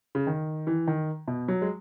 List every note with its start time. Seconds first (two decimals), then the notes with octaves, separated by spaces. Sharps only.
0.15 C#3
0.27 D#3
0.67 E3
0.87 D#3
1.28 B2
1.48 F#3
1.62 G#3